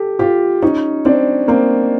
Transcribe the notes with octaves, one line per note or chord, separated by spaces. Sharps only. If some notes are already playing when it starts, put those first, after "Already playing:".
Already playing: G4 A4
F4 G4
C#4 D#4
C4 D4
A#3 C4